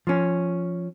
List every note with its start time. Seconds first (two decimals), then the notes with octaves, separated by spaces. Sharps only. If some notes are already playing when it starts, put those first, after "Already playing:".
0.07 F3 C#4